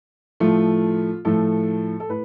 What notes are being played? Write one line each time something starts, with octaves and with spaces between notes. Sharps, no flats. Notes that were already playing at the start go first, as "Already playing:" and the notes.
A2 F3 A3 F4
A2 F3 A3 A4
A4
A2 B4